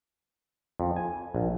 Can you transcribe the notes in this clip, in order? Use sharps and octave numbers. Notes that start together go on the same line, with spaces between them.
F2
G#5
A#1